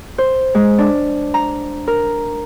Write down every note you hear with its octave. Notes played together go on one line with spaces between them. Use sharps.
C5
G#3
D4
A#5
A#4